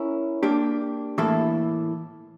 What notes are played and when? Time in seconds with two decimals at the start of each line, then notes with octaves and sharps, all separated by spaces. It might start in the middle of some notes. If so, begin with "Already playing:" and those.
Already playing: C#4 E4 A#4
0.43 A#3 D4 G4
1.18 A2 E3 A#3 E4 A4